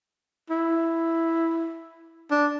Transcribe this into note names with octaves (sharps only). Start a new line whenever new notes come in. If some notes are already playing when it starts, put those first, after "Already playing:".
E4
D4